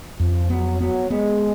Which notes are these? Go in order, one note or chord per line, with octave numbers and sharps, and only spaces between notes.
F2 F3
F#3 B3
F#3 B3
G#3 B3